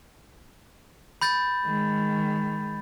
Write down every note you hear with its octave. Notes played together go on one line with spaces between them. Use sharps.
B5 G6 A6
D#3 G#3